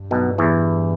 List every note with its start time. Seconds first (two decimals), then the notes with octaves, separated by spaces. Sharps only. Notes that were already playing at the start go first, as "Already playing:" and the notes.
Already playing: G2
0.11 B1 B2
0.38 E2 E3